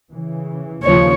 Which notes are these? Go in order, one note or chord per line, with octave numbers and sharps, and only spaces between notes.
C#3 E3
D#2 C#3 F3 C#5